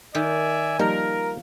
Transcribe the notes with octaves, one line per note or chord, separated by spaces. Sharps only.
D#3 D5 E5 G#5
F3 G3 A#3 D#4 A#4